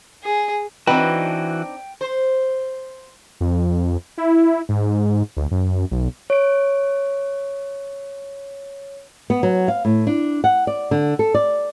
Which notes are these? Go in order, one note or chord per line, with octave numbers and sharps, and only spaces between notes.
G#4
E3 C4 D4 D#4 F#4 B4 G5
C5
F2
E4
G#2
D2
F#2
B1
C#5 D7
B3
F#3
F5
A2
D4
F#5
D5
D3
A4
D5